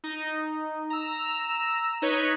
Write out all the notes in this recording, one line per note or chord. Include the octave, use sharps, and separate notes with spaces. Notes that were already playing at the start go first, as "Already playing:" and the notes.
D#4
A#5 E6
D#4 B4 C#5